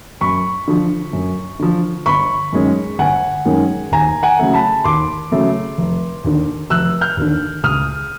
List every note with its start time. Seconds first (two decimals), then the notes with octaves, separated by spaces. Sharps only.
0.21 F#2 B5 C#6
0.68 D3 F3
1.13 F#2
1.59 D3 F3
2.06 G1 B5 C#6
2.53 F#2 D#3 G#3 C#4
2.99 G1 F#5 G#5
3.45 F#2 D#3 G#3 C#4
3.92 D#2 G#5 A#5
4.23 F#5 G#5
4.39 C#3 F#3 A3
4.53 A5 B5
4.84 D#2 C6 D6
5.32 C#3 F#3 A3
5.78 F1
6.24 D#2 D3
6.70 F1 E6 F#6
7.01 F6 G6
7.17 D#2 D3
7.63 C#2 D#6 F6